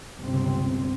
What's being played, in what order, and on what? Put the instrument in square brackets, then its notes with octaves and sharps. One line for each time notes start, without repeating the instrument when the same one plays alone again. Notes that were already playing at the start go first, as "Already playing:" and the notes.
[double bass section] G1 C#2 C3 C4